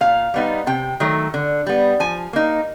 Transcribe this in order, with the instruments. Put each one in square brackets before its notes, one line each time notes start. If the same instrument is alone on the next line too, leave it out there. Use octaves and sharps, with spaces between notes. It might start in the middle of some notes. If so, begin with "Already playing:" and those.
[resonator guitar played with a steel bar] A#2 F5
G3 B3 D#4
C3 G5
D#3 F#3 A3
D3
G3 B3
F3 G#5
A#3 D#4